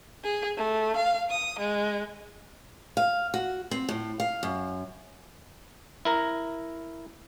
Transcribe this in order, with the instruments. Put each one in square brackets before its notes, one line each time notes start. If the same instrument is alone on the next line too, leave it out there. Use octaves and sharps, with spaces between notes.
[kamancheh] G#4
A3
F5
D#6
G#3
[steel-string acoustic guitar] F5
F#4
C4
A2
F5
F#2
[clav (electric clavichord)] E4 A#4 A#5